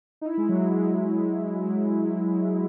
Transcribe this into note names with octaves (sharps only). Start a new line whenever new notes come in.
D#4
E4
G#3
F#3
G#3
F#3
G#3